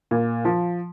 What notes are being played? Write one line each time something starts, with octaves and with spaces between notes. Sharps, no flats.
A#2
F3